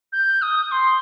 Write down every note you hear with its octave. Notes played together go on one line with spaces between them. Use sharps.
G6
D#6
C6